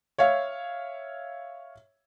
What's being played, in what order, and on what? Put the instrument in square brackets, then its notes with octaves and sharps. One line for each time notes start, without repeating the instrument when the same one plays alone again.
[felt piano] C#5 E5 F5